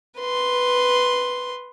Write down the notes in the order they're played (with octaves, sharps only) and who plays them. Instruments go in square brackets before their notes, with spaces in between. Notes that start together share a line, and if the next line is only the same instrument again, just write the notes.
[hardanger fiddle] B4 C6